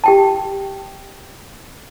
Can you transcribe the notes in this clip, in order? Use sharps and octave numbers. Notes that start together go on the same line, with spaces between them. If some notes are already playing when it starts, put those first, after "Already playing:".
G4 G5 A5